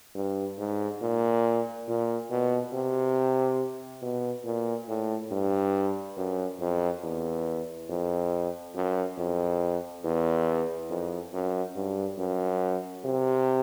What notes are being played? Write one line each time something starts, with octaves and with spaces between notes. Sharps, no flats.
G2
G#2
A#2
A#2
B2
C3
B2
A#2
A2
G2
F#2
F2
E2
F2
F#2
F2
E2
F2
F#2
G2
F#2
C3